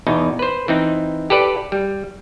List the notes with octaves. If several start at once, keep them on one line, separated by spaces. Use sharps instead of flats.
E2 B2 D#4
B4 C5
E3 C4 D#4
G4 A4 B4 D5
G3